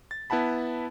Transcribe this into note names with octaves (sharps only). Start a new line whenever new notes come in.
A6
B3 E4 F#5 A5 B5